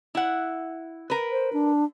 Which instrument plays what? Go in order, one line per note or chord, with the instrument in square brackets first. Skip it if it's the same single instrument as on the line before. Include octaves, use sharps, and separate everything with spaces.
[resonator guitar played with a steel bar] E4 F#5
A#4 B4
[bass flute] C5
D4